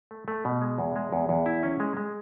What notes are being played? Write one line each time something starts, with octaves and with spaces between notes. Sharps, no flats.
A3
A3
B2
G#3
E2
G#3
E2
E2
E4
C#4
G#3
G#3